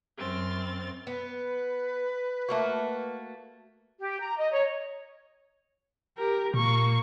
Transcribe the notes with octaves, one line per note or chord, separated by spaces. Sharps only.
F#2 C4 F6 A6
B3 B4
A3 A#3 F#4
G4
A#5
D#5
C#5
G4 A#4
A#2 A#3 C#6